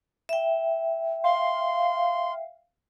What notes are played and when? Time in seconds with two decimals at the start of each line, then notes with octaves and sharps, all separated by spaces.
0.29 E5 G5
1.24 F5 C6